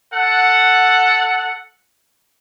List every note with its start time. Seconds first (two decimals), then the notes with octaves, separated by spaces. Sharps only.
0.13 A4 F#5